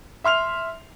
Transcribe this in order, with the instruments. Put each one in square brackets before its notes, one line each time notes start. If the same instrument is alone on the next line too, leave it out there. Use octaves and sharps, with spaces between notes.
[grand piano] E5 C6 F6 F7